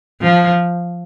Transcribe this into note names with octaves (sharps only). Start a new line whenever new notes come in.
F3